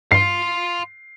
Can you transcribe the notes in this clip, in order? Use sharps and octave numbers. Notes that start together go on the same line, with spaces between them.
G2 F5 C6 C7